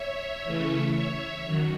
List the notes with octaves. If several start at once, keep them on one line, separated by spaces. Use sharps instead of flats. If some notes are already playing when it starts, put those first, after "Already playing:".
Already playing: C#5 E5
C#3 E3 A3 C#4
C#5 E5
F#2 D#3 F#3